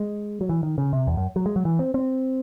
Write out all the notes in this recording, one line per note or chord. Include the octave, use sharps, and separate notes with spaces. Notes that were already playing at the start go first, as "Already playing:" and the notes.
Already playing: G#3
F#3
E3
D#3
C#3
C3
E2
F#2
F#3
G#3
F#3
E3
C4
C4